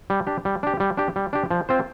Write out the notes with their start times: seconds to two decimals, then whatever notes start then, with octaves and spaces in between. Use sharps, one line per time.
0.10 G3
0.27 D4 G4
0.45 G3
0.63 D4 G4
0.80 G3
0.97 D4 G4
1.16 G3
1.33 D4 G4
1.51 F3
1.69 C4 F4 C5